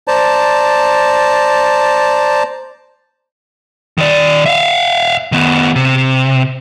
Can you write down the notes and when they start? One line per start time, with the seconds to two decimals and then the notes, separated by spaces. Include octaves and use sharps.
0.08 C5 D5 A5 A#5
3.98 D#3 D5
4.46 E5 F5
5.32 D#3 B3
5.76 C3